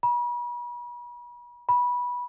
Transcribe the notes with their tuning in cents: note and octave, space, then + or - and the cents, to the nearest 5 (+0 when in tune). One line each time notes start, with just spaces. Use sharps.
B5 -40
B5 -15